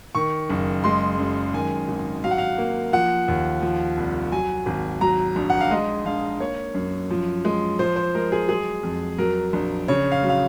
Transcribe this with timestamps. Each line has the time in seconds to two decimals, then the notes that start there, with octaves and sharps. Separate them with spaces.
0.15 D#3 C#6
0.49 F#1
0.84 G#3 C6
1.18 F#2
1.54 D#3 G#5
1.88 G#1
2.24 F#3 F5
2.31 F#5
2.38 F5
2.58 A#3
2.93 F3 F#5
3.28 D#2
3.62 F3
3.97 C2
4.32 F#3 G#5
4.66 G#1
5.01 F#3 A#5
5.36 A#1
5.50 F#5
5.61 F5
5.71 G#3 D#5
6.05 A#1 F5
6.40 A#3 C#5
6.75 F#2
7.10 F3
7.45 G#3
7.79 F3 C5
7.96 C5
8.15 G#3 A#4
8.32 G#4
8.48 F#3 G#4
8.83 F2
9.18 F#3 A#4
9.53 A#1
9.88 C#3 C#5
10.12 F5
10.23 F#3
10.29 F5